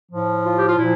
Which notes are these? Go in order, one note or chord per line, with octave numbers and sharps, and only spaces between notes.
A2 F3
F4
G4
F4
A#2 F3 E4